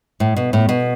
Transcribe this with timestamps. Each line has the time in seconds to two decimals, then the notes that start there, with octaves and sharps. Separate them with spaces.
0.20 A2
0.36 B2
0.53 A2
0.69 B2